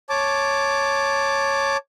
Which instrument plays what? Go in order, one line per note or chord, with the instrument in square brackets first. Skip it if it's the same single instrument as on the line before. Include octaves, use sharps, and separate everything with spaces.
[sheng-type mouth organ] C#5 A5 D6